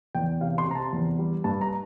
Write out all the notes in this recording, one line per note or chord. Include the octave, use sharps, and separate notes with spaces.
E2 G5
C3 F5
C6
C3 A#5
A5
E2
G3
G2 A5
A#5